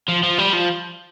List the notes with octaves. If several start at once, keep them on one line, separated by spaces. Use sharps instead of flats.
F3
F3
G3
F3